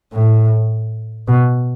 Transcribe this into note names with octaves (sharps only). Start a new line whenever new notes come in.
A2
B2